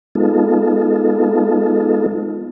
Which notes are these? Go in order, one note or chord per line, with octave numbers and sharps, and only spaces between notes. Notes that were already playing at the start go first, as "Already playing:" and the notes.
G#3 B3 D#4 F4 A4